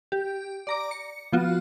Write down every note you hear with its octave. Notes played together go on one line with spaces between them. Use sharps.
G4
D5 A#5 D6
C#7
F3 B3 F4 F#4